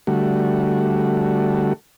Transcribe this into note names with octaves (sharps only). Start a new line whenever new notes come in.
D3 G3 A3 F#4